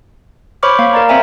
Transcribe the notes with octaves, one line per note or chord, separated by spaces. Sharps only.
C5 C#5 B5 C#6 D6 F6
A#3 F5
A#4 D5 A#5
C4 C5 E5 G#5 A#5